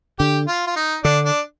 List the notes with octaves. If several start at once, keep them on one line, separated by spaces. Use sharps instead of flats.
D3 G4
F4
F4
D#4
D3 D4
D4